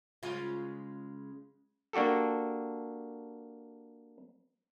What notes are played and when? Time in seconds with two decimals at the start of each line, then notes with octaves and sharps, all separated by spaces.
0.23 C#3 G#3 F4
1.93 A#3 D4 F#4 G4 A4